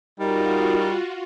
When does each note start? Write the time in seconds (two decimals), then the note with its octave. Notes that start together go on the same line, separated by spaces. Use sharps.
0.20 G3 D#4 F4 F#4 A#4